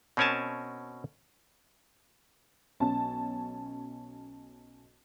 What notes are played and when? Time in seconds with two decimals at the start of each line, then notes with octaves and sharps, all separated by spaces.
0.17 B2 C4 C#4 A#4 G#5 A5
2.80 B1 C#4 A5